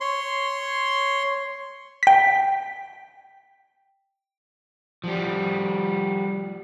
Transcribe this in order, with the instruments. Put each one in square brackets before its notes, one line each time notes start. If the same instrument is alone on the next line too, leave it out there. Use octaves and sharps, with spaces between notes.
[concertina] C#5 C6
[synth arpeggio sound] G5 B6
[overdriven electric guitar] F3 G3